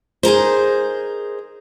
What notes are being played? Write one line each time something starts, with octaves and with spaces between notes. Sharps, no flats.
D#4 G#4 A#4 C5